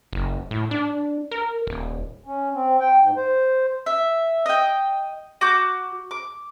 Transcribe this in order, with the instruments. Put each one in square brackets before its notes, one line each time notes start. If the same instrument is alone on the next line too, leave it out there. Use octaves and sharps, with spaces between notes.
[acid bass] F#1
A2
D4
A#4
D#1
[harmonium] C#4
C4
G5
G#2
C5
[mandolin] E5
D#5 G5
F#4 D6 G6
D6